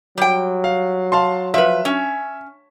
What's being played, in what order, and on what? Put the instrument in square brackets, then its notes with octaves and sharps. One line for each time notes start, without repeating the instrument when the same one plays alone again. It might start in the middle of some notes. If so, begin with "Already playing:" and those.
[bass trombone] F#3 [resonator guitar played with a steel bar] G3 G5
[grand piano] F5
F5 A5 C6
[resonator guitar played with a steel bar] F3 B4 [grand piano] E5
[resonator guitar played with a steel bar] C#4